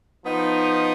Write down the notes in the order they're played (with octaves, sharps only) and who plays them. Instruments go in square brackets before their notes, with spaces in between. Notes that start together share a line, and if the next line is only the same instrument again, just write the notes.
[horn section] F3 B3 D#4